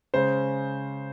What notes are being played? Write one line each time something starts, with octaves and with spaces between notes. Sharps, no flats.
C#3 G#3 C#4 C5